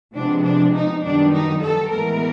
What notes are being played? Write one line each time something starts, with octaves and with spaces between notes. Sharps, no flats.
C3 F3 G#3 B3 D4
D4
D#4
F#2 D#3 G3 B3 D4
D#4
A4
A2 E3 G#3 B3 A#4